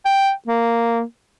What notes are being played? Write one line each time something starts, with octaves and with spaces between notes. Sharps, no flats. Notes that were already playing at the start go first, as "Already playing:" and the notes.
G5
A#3